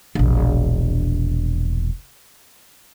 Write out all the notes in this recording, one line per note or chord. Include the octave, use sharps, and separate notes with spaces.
E1 A#1